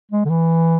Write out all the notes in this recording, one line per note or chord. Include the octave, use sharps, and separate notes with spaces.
G#3
D3
E3